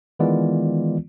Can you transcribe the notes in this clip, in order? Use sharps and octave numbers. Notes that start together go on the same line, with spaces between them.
D#3 E3 G#3 B3 F4 D5